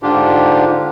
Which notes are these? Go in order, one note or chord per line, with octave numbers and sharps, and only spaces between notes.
G#2 D3 D4 F4 G4